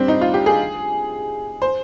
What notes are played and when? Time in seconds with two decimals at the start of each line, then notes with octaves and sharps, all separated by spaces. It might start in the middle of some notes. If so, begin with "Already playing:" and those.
Already playing: G3 C4 D4
0.08 D#4
0.21 F4
0.34 G4
0.46 G#4
1.62 C5